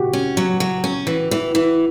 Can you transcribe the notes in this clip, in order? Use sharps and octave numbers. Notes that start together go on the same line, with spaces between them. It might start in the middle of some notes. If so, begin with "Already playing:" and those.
Already playing: F#4 G4
C#4
F#3
F#3
C#4
E3
E3
E3